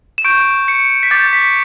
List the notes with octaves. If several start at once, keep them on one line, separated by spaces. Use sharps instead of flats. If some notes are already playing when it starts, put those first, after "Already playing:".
E7
C#6 G6 D7
C#7
B6
D6 G6 A6
B6